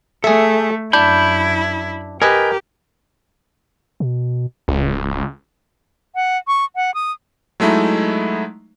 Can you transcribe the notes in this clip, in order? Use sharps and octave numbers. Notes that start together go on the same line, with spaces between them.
A3 G#4 A4 E5
F#2 D4 E4 B5 G6
G4 A#4 B4 D#5 G#5
B2
D1 C#2
F#5
C#6
F#5
D#6
F#3 G#3 A3 D#4 E4